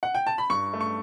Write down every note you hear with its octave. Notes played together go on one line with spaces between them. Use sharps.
F#5
G5
A5
B5
G2 C#6
A3
C#6